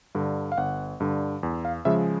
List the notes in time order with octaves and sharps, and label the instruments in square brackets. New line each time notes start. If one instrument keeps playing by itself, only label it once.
[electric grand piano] G2 D3
F5
G1 F#5
G2 D3
E2
F5
C#3 F3 G#3 E5